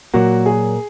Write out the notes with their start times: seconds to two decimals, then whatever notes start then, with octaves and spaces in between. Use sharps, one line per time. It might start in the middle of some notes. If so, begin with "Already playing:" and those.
0.14 A#2 F#3 A#3 F#4
0.46 G#4